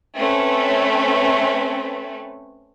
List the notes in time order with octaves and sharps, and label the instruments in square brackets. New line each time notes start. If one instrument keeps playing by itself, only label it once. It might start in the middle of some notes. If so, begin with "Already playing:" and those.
[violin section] A3 C4 C#4 B4